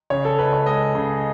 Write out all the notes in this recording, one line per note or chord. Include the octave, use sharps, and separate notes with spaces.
C#3 C#5
A4
C#2 B4
C#5
G#3 D#5
C#3